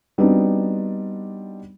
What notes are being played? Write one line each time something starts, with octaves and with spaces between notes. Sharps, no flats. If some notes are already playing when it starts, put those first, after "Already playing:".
G3 B3 C4 D4 D#4 F#4